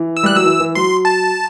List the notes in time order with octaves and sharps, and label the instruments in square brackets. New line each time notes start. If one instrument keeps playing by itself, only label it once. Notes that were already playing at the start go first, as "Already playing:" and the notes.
Already playing: [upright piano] E3
[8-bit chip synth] E6
[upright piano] G3 [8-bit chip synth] F#6
[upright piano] F#3 [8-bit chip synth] E6
[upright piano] E3
E3
[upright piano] F#3 [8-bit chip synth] C6
[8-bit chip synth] A5